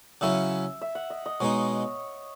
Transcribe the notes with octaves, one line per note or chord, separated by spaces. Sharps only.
C#3 F#3 C#4 E4 E5
E5
F#5
D#5
D#5
B2 G#3 D#4 C#5